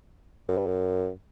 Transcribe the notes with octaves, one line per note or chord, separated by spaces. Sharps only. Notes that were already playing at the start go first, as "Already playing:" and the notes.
F#2
G2
F#2